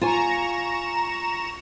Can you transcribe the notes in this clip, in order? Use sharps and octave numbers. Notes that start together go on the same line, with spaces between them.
F4 G#5 A#5 C#6 E7